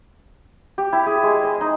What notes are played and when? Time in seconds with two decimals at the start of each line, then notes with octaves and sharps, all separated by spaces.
0.78 G4
0.93 E4
1.06 G#4
1.23 G#3
1.43 D#5
1.61 D#4